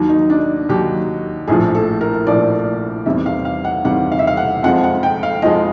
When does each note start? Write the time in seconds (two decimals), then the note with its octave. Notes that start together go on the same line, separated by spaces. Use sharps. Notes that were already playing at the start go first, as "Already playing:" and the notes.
Already playing: D#2 D#3 F#3
0.09 D#4
0.30 D4
0.69 D#2 D#3 F#3 G4
1.47 A#1 A2 F3 G#4
1.75 A4
2.01 A#4
2.27 A#1 A2 F3 D5
3.06 E2 C3 D#3 G3 E5
3.26 F5
3.45 F5
3.64 F#5
3.85 E2 C3 D#3 G3 F#5
4.12 F5
4.19 E5
4.27 F5
4.37 F#5
4.63 F2 C3 F3 G#3 F#5
4.83 F#5
5.03 G5
5.23 F5
5.42 F2 C3 F3 G#3 D#5